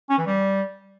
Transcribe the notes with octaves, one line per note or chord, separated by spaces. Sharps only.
C#4
E3
G3